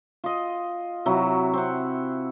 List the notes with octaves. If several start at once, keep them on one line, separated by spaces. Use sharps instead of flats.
F4 D#5
C3 F#3 E4 F#4
C4 F#5